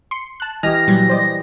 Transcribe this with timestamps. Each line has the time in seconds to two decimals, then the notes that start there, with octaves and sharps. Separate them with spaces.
0.11 C6 C#7
0.40 A5 F#6
0.63 E3 G4 D#5 G#5 F6 A#6
0.88 A#2 F#3 G3
1.09 C5 D5 D#5